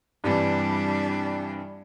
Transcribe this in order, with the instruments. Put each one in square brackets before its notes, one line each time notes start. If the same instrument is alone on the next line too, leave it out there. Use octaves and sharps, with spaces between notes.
[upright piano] G2 C3 E3 [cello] G3 D4